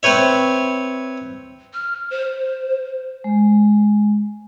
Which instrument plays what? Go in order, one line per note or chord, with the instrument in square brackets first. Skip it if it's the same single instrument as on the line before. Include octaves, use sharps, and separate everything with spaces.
[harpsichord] C4 B4 C#5 E5
[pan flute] F6
C5
[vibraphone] G#3